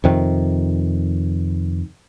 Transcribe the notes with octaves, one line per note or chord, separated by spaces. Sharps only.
F2 C3 D#3